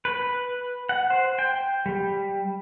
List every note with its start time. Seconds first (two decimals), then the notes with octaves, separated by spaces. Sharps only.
0.05 B4
0.89 F#5
1.10 C5
1.39 G5
1.86 G3